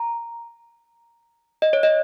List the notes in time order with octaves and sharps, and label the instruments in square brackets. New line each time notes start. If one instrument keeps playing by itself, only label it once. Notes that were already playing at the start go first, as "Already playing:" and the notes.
Already playing: [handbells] A#5
D#5
C#5
D#5